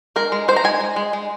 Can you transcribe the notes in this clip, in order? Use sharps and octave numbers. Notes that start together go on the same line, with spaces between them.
G#3 A#4
G#3
G#3 C5
A#5
G#3 G#5
G#3
G#3
G#3